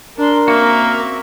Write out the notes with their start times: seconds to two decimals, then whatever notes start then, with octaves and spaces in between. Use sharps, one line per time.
0.18 D4 A#4 C6
0.48 A#3 C4 C#4 F#4 E5